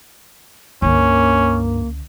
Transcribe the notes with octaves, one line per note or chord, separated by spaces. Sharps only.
C#2 G2 D3 A#3 C#4